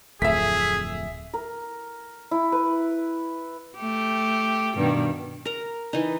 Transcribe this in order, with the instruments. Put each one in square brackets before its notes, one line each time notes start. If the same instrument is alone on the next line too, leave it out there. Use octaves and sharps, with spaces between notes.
[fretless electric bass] D1 F2 A3 [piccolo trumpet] G#4 [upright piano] E5 B6
[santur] A#4
E4
B4
[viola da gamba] A3 G4
G2 B2 D#3
[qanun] A#4 A#5
E3 D#4